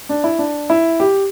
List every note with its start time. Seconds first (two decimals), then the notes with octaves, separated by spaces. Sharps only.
0.09 D4
0.24 E4
0.39 D4
0.70 E4
1.00 G4